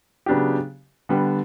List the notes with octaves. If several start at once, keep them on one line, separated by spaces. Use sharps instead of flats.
C#3 F#3 B3 D4 G4
D3 G3 B3